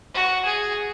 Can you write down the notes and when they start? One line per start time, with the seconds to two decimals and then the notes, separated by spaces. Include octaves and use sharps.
0.14 F#4
0.45 G#4